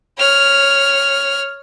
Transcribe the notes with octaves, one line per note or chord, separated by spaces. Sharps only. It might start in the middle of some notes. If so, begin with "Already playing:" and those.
C#5 F6